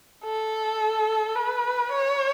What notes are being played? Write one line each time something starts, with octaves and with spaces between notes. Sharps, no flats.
A4
B4
C#5